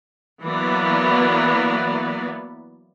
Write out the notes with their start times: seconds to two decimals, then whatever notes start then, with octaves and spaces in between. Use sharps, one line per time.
0.42 E3 F#3 A#3 B3 B4 D5